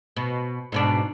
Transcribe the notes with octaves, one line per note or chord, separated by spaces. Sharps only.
B2
G#2 B2 D4